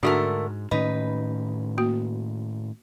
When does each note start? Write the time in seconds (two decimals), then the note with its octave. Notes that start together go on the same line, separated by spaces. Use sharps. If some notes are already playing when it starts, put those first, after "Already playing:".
0.03 G#2 D3 A3 D4 F#4 A#4
0.71 A2 D#3 C#4 D#4 B4 B5
1.78 A#3 F#4